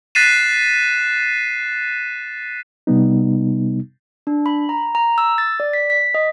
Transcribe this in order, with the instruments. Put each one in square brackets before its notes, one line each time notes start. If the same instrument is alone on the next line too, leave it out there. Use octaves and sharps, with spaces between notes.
[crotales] F#6 A6 B6 C7 D#7 E7
[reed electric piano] C3 G3 B3 D#4
[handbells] D4
B5
A#5
A#5
E6
A6
D5
B6
B6
D#5